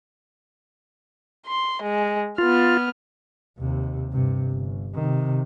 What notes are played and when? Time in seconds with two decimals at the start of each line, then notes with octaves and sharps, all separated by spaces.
1.47 C6
1.82 G#3
2.38 B3 F4 F6
3.58 D#2 C3
4.12 G2 C3
4.51 G1
4.94 C3 D#3